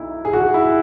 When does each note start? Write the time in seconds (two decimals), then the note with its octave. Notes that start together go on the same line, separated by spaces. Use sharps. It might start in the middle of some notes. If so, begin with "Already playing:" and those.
Already playing: B1 D#4 E4
0.25 G#4
0.33 F#4
0.54 E4